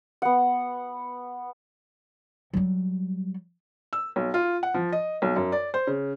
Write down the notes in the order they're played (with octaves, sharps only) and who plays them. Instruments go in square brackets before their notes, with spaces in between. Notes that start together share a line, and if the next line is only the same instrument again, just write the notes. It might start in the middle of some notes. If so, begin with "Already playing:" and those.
[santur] B3 F#5
[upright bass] F#3 G3
[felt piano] E6
B1
F4
F#5
F3
D#5
B1
F#2
D5
C5
C#3